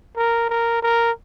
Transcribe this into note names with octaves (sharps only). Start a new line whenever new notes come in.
A#4
A#4
A#4